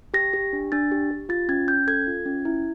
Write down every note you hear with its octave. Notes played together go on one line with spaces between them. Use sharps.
G4 A#6
G4
D4
D4 A6
G4
G4
F4 A6
C#4 G#6
C#4 G6
A4 G#6
F4
C#4
E4